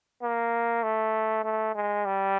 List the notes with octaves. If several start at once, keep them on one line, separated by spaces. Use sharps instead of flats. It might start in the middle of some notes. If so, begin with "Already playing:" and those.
A#3
A3
A3
G#3
G3